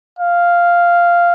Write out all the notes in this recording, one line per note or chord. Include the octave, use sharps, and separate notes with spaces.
F5